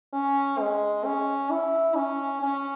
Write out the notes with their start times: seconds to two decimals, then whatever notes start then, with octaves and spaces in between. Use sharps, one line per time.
0.13 C#4
0.59 G#3
1.05 C#4
1.51 E4
1.96 C#4
2.42 C#4